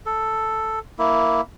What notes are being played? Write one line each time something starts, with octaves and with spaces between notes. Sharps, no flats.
A4
A#3 E4